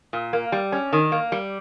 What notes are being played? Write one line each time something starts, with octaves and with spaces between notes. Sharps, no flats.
A#2
A#3
G3
C#4
D#3
A#3
G3